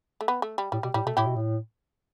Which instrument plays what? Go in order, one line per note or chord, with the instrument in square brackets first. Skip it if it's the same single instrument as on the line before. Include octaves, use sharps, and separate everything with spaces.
[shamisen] A3
B3
A3
G3
[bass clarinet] A2 [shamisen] G3
[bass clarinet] B2 [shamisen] G3
[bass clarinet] A2 [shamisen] G3
[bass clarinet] B2 [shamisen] A3
[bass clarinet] A2 [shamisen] E4 G4
[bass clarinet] B2
A2